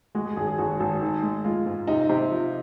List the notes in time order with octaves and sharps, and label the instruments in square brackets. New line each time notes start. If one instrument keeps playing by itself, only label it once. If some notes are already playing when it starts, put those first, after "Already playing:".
[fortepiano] G#3 [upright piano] F#4
[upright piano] G#4
[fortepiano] G#1 [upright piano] G#4
[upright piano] G#4
[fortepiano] G#1 [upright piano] F#4
[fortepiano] G#1
D#3
G#3
[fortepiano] G#3 [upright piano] F4
[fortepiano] G#2
[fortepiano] C3 [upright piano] D#4
[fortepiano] C3
F3